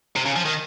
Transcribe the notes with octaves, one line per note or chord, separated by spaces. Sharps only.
C3
C#3
F3
D#3